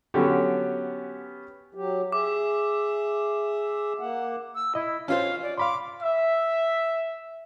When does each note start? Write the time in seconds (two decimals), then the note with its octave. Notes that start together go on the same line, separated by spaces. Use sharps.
0.14 D3 F#3 B3 C#4 G4
1.74 F#3 G4
2.12 G#4 E5 D6
4.00 A#3 F#5
4.55 E6
4.75 E4 D#5
5.08 C#4 F4 C5 F5
5.43 D5
5.57 F5 B5 C6 D6
6.02 E5